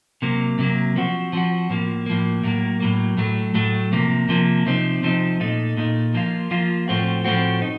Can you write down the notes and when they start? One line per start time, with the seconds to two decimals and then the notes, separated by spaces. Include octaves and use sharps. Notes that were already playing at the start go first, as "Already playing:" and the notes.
0.22 C3 F#3 A#3
0.59 C3 F#3 A#3
0.96 F3 C4 F#4
1.33 F3 C4 F#4
1.70 A2 F3 A#3
2.06 A2 F3 A#3
2.44 A2 F#3 A#3
2.80 A2 F#3 A#3
3.17 A2 F#3 A3
3.54 A2 F#3 A3
3.92 C3 F3 A#3
4.29 C3 F3 A#3
4.66 C3 F3 C4 D#4
5.03 C3 F3 C4 D#4
5.40 A#2 A3 D#4
5.77 A#2 A3 D#4
6.14 F3 A#3 F4
6.51 F3 A#3 F4
6.88 A2 F3 A3 C4 F#4
7.25 A2 F3 A3 C4 F#4
7.62 D#4